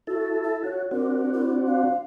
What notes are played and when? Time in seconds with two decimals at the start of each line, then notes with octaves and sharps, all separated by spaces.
0.07 E4 F#4 A4
0.43 E5
0.64 F#4 C#5
0.91 C4 D4 F#4 A#4
1.33 E4
1.67 F5